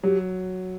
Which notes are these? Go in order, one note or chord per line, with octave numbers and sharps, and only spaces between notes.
F#3 G4